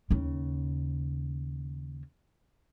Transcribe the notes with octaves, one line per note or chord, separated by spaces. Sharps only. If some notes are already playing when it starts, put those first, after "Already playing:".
D#2 C#3